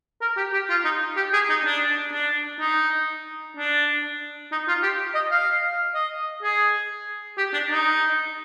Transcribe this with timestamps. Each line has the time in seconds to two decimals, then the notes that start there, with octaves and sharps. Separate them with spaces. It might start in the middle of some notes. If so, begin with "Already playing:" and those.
0.21 A#4
0.37 G4
0.53 G4
0.70 F4
0.85 D#4
1.16 G4
1.33 G#4
1.50 D#4
1.65 D4
2.13 D4
2.60 D#4
3.57 D4
4.52 D#4
4.68 F4
4.83 G4
5.15 D#5
5.32 F5
5.94 D#5
6.43 G#4
7.38 G4
7.53 D4
7.71 D#4